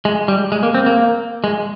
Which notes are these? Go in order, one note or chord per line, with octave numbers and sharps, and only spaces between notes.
G#3
G3
G#3
A#3
C4
A#3
G#3